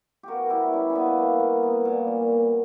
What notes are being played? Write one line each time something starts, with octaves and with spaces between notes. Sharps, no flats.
B3 F#4 G4 A#4
G3 E4 G4 A#4
B3
G3 C#4
C#4
A#3 B3
A#3
A#3
B3
A#2
A#2
B2